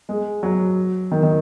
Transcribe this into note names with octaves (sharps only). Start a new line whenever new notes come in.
G#3
F#3
D#3
D#3